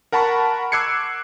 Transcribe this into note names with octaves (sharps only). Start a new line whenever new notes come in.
A#4 F#5 A5 B5 C#6
D6 E6 F#6 G#6 C7 C#7